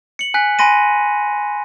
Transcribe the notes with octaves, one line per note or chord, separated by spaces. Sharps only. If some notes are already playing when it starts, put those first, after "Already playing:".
C#7 F#7
G#5 F#6 B6
G#5 B5 C6 A#6 D#7